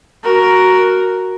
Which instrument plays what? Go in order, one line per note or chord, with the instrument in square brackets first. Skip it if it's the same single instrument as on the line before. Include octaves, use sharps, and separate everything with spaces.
[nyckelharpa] F#4 A#4